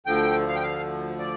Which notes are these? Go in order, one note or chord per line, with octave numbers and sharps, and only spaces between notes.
D2 D3 F3 G5
F5
G5
F5
D5